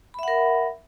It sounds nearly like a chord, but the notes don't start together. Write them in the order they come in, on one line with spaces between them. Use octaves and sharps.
B5 E5 F#5 A#4